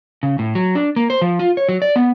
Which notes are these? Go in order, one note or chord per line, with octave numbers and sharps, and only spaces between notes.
C#3
A2
F#3
D4
A#3
C5
F3
F4
C#5
F#3
D5
B3